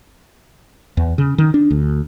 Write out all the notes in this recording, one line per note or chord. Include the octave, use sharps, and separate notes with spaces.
E2
C#3
D#3
D4
D2